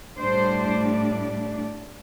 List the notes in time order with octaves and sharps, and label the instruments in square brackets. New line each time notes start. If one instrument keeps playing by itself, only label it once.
[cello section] A2 G3 D4 C5